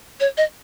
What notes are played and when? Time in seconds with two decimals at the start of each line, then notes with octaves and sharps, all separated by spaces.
0.20 C#5
0.37 D#5